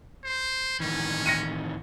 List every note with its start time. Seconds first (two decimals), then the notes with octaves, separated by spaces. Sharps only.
0.24 C5
0.80 A2 D#3 E3 C#4
1.26 A#6 C#7 D#7